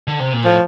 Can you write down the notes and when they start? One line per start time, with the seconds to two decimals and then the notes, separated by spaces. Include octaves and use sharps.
0.08 D3
0.20 C3
0.33 A#2
0.45 A2 F3